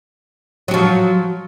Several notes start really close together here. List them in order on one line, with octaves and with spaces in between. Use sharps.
F#3 F#4 F3